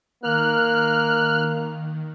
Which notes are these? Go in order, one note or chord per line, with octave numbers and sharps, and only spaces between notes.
D#3 A#3 F6 F#6